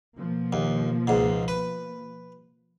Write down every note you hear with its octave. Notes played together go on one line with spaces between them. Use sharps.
B2 F3 A#3
D#2
C#2 G#2
B4